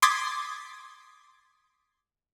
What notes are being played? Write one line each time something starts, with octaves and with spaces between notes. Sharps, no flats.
C6 D6 D#6 G#6 A6 B6